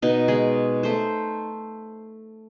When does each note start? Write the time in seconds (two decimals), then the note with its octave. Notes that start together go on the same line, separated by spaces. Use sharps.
0.02 B2 D#4
0.28 G#3 G#4
0.83 A3 C5